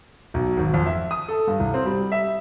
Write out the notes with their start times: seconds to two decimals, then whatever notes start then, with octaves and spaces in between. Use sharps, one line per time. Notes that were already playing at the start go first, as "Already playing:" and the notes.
0.34 B1
0.57 G#1
0.74 F2
0.86 E5
1.11 D#6
1.29 A4
1.47 G2
1.59 C2
1.74 C4
1.86 G3
2.12 E5